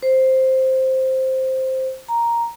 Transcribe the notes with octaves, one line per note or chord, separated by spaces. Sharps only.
C5
A#5